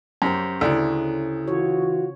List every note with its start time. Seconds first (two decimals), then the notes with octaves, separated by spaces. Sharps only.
0.22 F#2 C#4 G4 C5
0.61 D2 C#3 E4 A4 C#5
1.48 E3 F4 F#4 C#5